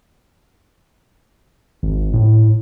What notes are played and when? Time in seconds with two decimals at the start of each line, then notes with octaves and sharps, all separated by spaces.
1.83 G#1
2.14 A2